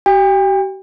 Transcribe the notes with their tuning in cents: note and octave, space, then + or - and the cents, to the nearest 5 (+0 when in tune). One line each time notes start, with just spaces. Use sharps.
G4 -40 G5 +40